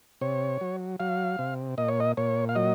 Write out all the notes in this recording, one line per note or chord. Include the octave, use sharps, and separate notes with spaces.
C3 C#5
F#3
F#3 F5
C3
A#2 D#5
C#5
D#5
A#2 C#5
F5
F#3 D#5